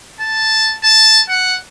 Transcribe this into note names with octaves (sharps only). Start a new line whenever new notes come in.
A5
A5
F#5